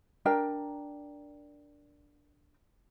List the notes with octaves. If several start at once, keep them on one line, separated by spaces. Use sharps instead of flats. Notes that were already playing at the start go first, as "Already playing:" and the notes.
D4 A#4 G5